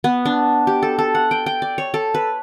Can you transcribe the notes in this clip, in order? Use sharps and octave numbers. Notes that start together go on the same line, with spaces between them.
B3
D4
G4
A4
A4
F#5
G5
G5
D5
C#5
A4
B4